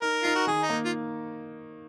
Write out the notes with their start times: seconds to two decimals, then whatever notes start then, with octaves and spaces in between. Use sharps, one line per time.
0.02 D#4 A#4
0.23 D#4 F4
0.35 F#4
0.47 D#3 G#4
0.62 D#4
0.69 A#3
0.85 F4